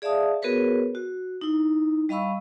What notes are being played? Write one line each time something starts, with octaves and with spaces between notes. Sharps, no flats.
G#4 D5 E5 F5 A5 D#6
B3 F#4 G#4 A#4 B4 C#5
F#4
D#4 E4
G3 D#5 F5 B5 C#6 E6